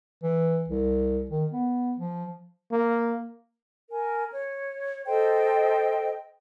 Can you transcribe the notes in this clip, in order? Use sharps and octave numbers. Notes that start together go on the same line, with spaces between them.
E3
C2
D#3
B3
F3
A#3
A#4 G#5
C#5
A4 C5 D#5 G5